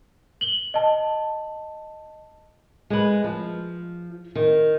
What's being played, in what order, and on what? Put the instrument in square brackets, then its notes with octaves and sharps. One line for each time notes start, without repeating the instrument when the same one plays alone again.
[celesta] F#7 G7
D#5 A5
[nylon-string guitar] G#3 B4
F3
D#3